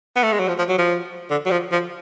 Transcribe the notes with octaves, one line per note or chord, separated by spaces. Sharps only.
B3
A3
G#3
F#3
F3
F3
F#3
F3
D3
F#3
F3
F3